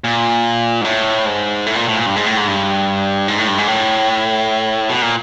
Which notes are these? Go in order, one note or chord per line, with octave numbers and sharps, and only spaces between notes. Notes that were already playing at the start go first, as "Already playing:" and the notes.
A#2
G#2
A2
G#2
A2
A#2
A2
A#2
G2
G#2
A2
G#2
G2
G#2
A2
G2
G#2
A2
B2
A#2